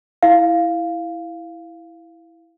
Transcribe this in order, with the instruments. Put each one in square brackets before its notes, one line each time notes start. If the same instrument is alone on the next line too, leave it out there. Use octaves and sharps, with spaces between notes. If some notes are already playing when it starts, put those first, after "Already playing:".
[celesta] E4 F5